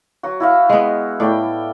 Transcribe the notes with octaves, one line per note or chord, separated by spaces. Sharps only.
F#3 F#4
E4 F#4 F5
G#3 B3
A2 D5 G5